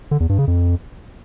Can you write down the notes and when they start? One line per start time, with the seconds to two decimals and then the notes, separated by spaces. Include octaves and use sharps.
0.11 D3
0.20 E2
0.29 G2
0.38 C#3
0.48 F2